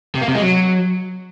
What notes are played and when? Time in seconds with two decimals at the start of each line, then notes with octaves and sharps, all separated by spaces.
0.15 C3
0.22 A#3
0.28 C3
0.35 G#3
0.41 F#3